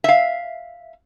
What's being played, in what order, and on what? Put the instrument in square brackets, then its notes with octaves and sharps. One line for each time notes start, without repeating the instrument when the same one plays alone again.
[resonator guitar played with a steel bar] E5 F5